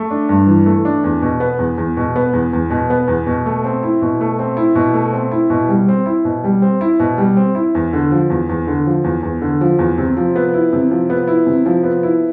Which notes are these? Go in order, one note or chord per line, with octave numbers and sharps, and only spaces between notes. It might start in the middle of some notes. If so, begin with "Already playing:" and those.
Already playing: A3
D4
G2
E3
A3
D4
E2
B2
B3
E2
E2
B2
B3
E2
E2
B2
B3
E2
B2
A3
C4
E4
B2
A3
C4
E4
B2
A3
C4
E4
B2
G3
C4
E4
B2
G3
C4
E4
B2
G3
C4
E4
E2
D3
F3
E2
E2
D3
F3
E2
E2
D3
F3
E2
C3
F3
B3
E4
C3
F3
B3
E4
C3
F3
B3
E4